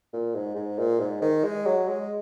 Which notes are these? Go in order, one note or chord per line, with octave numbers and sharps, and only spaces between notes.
A#2
G#2
G#2
A#2
G#2
D#3
G#3
F#3
G#3